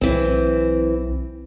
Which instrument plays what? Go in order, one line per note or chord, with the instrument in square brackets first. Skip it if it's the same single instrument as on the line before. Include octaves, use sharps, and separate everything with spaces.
[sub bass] B1 [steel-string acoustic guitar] E3 C4